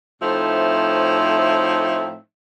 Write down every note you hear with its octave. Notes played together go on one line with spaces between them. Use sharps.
A2 F3 A3 C4 D#4 E5